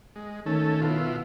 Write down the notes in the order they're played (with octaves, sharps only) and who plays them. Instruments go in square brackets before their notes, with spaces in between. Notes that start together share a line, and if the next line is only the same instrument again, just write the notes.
[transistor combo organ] G#3
[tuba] D#3 [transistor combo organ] A3 C#4 A4
[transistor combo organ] B2 E4 F4